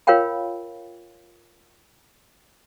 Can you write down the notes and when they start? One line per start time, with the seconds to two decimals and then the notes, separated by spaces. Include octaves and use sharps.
0.07 F4 A#4 C#5 F5 G5 B5